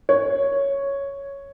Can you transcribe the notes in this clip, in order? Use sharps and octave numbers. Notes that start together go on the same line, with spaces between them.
C#5